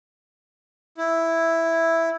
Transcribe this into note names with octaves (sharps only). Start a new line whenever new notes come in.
E4